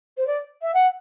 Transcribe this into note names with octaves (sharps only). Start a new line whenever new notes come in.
C5
D5
E5
F#5